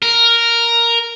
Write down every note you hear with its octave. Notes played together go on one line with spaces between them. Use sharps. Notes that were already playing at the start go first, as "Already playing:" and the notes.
A#4